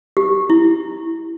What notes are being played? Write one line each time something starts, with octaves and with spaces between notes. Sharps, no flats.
G4
E4